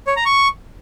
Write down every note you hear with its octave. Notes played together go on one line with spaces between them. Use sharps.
C#5
A#5
C#6